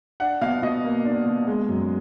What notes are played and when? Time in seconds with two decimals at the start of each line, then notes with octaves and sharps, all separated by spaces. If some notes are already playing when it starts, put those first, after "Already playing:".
0.20 D4 F#5
0.41 B2 F5
0.62 B2 D#5
0.84 A#3
1.05 D4
1.26 B2
1.47 G#3
1.69 F#2